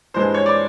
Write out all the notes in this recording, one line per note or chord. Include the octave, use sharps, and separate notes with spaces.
G2 E3 G#3 C5
C#5
D5